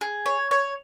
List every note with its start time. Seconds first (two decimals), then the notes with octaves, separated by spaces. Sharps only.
0.01 G#4
0.26 C#5
0.51 C#5